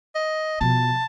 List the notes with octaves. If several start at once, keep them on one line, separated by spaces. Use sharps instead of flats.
D#5
B2 F3 A5